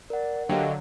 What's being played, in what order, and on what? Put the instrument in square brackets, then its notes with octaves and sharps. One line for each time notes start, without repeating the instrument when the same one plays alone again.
[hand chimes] A#4 F#5 [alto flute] D5
[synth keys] D3 F#3 [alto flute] G4 [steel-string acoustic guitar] D#5 F5 G5